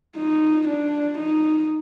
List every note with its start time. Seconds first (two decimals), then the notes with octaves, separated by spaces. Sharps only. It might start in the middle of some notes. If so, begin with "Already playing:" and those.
0.17 D#4
0.68 D4
1.18 D#4